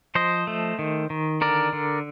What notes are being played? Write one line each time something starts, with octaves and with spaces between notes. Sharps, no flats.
F3 C5 D#5
A3
D#3
D#3
D3 A#4 D5
D3